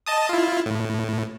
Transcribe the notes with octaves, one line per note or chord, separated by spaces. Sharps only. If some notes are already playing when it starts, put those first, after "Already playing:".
D#5 A5 D#6
E4 F4
A2